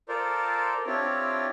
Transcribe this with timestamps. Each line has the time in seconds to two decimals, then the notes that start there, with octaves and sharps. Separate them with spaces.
0.08 F4 A4 A#4 C5 D5
0.87 C4 D4 E4 F4 G4 C#5